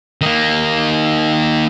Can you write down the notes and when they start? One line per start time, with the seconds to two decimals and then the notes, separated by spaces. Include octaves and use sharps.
0.21 D#3 A#3